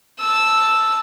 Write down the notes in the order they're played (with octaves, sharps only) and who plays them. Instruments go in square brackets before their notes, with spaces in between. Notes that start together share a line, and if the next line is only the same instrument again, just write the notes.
[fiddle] A5 E6